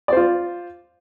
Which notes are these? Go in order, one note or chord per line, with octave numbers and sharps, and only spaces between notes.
F4 C5 D5